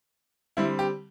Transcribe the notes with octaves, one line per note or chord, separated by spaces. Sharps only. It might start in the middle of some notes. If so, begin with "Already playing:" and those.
D3 G3 C4 E4
G4